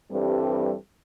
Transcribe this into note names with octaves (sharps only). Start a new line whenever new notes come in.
G2 E3 G3 C4 G4 A4